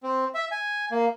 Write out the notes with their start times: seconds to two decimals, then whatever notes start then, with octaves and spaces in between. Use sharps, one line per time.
0.03 C4
0.34 E5
0.52 G#5
0.91 A#3